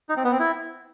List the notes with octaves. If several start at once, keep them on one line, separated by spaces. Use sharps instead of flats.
D#4
C4
B3
C4
E4